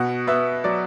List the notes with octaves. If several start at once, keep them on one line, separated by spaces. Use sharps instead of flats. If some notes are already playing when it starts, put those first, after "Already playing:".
Already playing: B2 F#5
B3 E5
F#3 D5